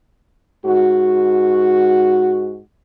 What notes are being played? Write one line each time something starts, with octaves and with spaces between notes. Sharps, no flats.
G#2 F#4